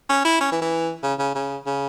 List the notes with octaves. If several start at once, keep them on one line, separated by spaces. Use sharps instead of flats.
C#4
E4
C#4
E3
E3
C#3
C#3
C#3
C#3